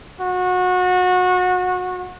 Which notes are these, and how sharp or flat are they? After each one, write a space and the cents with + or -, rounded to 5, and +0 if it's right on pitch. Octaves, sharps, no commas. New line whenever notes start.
F#4 -25